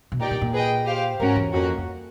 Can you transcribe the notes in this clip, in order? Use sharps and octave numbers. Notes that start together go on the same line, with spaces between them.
B2
A#2 D#4 G4 A#4 D5 G5
A#2
A#2
G#4 B4 D#5 G5
G4 C5 F5
G#2 C#4 F#4 A#4
E2
F2 A#3 C#4 F#4
F2